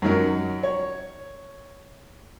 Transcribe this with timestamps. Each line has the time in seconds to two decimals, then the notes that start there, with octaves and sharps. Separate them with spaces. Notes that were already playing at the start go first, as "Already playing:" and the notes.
0.02 F#2 D#3 F#3 A#4
0.63 C#5